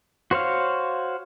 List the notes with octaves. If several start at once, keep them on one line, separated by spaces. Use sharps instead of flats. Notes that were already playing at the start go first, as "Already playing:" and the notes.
F#4 C5 C#5 F5